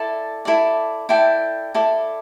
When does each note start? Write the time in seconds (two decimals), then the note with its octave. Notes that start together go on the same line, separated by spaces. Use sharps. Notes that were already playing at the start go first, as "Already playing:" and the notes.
Already playing: E4 A4 D5 A5
0.45 E4 A4 D5
1.09 E4 A4 D5 G5
1.74 E4 A4 D5